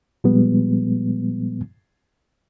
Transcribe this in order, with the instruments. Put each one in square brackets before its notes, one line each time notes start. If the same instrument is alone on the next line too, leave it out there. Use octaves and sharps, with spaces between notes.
[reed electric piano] A#2 F3 G3 G#3 B3